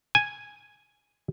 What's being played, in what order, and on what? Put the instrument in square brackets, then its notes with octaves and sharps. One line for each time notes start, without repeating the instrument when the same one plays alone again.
[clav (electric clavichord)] G#5